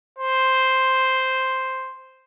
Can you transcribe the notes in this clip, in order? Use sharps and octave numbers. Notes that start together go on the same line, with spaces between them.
C5